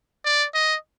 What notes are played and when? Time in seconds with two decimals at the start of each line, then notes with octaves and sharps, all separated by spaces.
0.25 D5
0.55 D#5